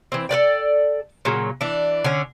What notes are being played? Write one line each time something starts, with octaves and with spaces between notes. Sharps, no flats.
E3 C4
A4 B4 D5 G5
A#2 C#3 F#3
E3 D4
D3 C#4